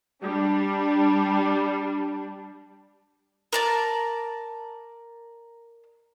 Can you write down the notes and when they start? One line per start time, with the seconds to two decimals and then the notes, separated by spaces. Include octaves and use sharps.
0.22 G3 D4
3.53 A#4 D5 A5